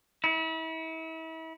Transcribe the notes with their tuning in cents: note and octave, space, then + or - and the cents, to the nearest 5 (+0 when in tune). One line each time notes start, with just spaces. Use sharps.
E4 -35